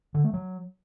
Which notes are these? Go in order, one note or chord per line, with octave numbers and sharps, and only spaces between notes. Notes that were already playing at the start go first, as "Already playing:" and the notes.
D3
A3
F#3